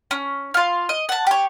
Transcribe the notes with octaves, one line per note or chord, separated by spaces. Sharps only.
C#4
F4 F5
D#5
F#5 A5
G4 C#5